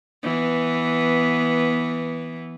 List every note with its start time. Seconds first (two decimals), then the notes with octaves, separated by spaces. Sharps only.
0.23 E3 B3